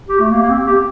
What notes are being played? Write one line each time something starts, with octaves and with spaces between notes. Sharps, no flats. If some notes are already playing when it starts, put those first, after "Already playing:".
G4
A3
A#3
A#3
C4
G4